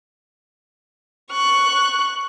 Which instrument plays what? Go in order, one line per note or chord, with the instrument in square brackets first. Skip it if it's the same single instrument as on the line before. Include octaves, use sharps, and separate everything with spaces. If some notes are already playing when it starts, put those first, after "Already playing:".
[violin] C#6 F#6